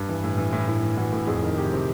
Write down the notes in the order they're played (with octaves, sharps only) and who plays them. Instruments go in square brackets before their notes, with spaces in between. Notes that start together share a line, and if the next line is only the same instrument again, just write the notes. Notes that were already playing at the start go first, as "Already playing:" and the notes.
Already playing: [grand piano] G2
E3
A2
E3
A2
A2 E4
E3
E3 F#4
A2
F2 G#4
D#3
C3 G4
C3